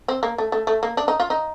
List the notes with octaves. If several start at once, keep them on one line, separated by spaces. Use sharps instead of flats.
C4
A#3
A3
A3
A3
A#3
D4
D#4
F4
D#4